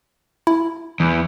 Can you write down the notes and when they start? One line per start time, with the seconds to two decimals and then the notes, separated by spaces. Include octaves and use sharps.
0.47 E4
1.00 E2